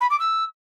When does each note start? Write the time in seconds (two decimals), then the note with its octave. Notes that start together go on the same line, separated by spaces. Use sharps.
0.01 B5
0.10 D6
0.20 E6